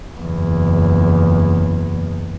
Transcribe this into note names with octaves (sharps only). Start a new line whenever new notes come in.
F#1 E2